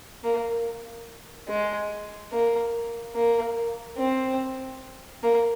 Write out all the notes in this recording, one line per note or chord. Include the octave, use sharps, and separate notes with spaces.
A#3
G#3
A#3
A#3
C4
A#3